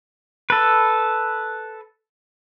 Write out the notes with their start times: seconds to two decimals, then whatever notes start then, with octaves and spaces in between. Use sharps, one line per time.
0.50 A4 B4